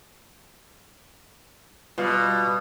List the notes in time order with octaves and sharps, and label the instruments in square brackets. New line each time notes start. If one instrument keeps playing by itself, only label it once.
[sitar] B2 [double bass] G3 [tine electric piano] F4 B4 F5